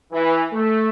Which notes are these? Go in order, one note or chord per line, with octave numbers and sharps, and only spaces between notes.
E3
A3